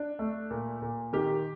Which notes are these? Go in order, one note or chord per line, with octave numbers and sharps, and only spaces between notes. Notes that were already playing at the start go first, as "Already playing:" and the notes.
Already playing: D4
A3
A#2
A#2
D#3 G4